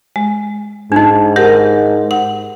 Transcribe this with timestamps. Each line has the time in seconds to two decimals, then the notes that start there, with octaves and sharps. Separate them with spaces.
0.16 G#3
0.92 G#2 D4 D#4
1.36 G4 A#4 F#5
2.11 F#5